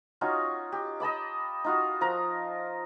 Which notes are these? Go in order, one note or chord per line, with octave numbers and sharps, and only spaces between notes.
C#4 D#4 F4 F#4
G4
D#5 A5 B5 D6
D#4 F4 F#4
F3 A#4 A#5